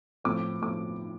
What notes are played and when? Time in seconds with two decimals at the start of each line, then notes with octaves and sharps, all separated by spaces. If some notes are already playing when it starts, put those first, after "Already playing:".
0.24 A2 F3 C4 D6
0.62 A2 F3 D6